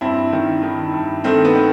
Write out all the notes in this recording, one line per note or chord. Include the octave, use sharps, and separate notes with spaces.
G2 C4 E4
D#3
D#3
G2
D#3 A3 C4
B3
D#3